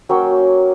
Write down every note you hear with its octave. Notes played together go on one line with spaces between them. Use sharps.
F#3 A#3 C#4 G5